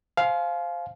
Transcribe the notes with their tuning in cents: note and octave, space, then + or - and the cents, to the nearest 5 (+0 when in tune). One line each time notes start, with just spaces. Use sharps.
C5 +0 F5 +0 G#5 +40